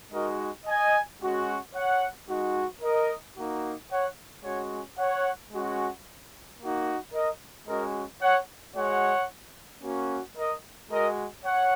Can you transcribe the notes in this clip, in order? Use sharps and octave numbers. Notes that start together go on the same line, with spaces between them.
G#3 D#4 F#4 A#4 D#5
D#5 G#5
G#3 C#4 F#4
C#5 F#5
G#3 D#4 F#4
A#4 D#5
A#3 D#4 F#4
C#5 F#5
G#3 C#4 F#4 C#5 F#5
C#5 F#5
G#3 C#4 F#4
A#3 D#4 F#4
A#4 D#5
G#3 C#4 F#4 A#4 D#5
C#5 F#5
G#3 F#4 C#5 F#5
A#3 C#4 F#4
A#4 D#5
G#3 F#4 A#4 D#5
C#5 F#5